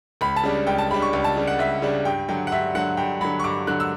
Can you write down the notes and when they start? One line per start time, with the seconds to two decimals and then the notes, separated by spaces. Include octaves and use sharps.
0.21 C#2 B5
0.36 A5
0.43 C#3 G3 D4
0.67 C#2 G5
0.78 A5
0.90 C#3 G3 D4 B5
1.02 C#6
1.13 C#2
1.24 A5
1.36 C#3 G3 D4
1.47 F#5
1.59 C#2 E5
1.82 C#3 G3 D4
2.05 G2 G5
2.28 D3 F#3 G5
2.47 F#5
2.52 G2 E5
2.75 D3 F#3 F#5
2.97 G2 G5
3.21 D3 F#3 B5
3.40 C#6
3.44 G2 D6
3.67 D3 F#3 F#6
3.80 E6